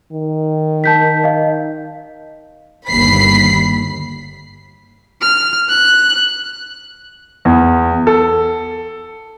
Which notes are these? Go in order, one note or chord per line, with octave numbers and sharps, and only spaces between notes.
D#3
A5 G6 B6
D#5 F5
G1 D#2 B5 B6 C7
F6
F#6
E2
A4